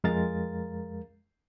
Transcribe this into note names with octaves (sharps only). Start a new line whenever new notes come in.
F2 G#3 A#4 F5 A#5 A6